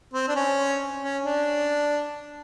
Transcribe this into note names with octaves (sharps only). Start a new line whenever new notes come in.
C4
D4
C#4
C#4
D4